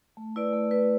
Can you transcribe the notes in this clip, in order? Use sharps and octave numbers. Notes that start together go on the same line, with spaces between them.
A3
E4 B4 D5
A3
E4 B4 D5